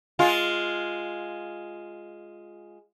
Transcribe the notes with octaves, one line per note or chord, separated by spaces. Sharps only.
G#3 F4